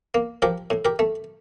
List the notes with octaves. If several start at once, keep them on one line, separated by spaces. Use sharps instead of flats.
A#3
F3 G4 A#4
A2
G4 A#4
A3